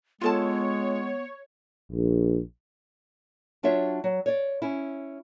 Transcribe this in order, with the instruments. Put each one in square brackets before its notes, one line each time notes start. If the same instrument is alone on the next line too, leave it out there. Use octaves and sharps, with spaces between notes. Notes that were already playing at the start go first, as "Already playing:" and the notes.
[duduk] G#3 [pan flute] B3 [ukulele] F4 A4 A5 [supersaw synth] C#5
[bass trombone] A#1
[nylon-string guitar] F#3 D4 F4 C#5 E5
F#3
C#5 D5
C#4 E4